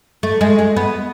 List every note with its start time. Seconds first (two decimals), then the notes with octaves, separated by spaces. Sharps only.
0.23 A3
0.41 G#3
0.59 G#3
0.76 B3